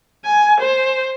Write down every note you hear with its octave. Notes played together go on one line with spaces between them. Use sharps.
G#5
C5